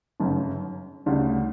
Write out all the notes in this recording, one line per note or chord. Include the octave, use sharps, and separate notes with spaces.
G1 F#2 C#3
D2 C#3 G3